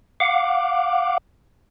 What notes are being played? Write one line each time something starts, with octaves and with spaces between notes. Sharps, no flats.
F5 F#5 D6